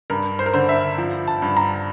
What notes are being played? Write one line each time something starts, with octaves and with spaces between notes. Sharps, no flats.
G2 A#4
C5
A#4
D3 C5
E5
F3
A5
G2
A#5